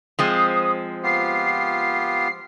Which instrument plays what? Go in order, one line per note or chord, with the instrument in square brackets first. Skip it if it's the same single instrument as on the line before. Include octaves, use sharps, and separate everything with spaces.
[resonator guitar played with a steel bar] F3 G#3 C4 [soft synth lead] D#6
[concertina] B3 F4 G4 [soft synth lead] C7